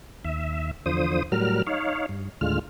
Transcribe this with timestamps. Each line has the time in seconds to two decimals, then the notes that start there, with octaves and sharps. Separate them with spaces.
0.24 D#2 E5
0.86 E2 D3 F3 C5 D#6
1.32 A2 F#3 G3 A#4 F6
1.67 D#4 C#5 F5
2.09 G2
2.41 D#2 A2 D3 G#3 F4 F6